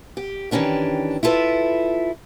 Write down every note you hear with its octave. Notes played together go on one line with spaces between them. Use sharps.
G4
D#3 E3 C#4 D4 G4
E4 F4 A4 B4